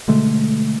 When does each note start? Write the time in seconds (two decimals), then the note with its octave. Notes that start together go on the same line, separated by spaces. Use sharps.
0.08 B2 D3 G#3 A3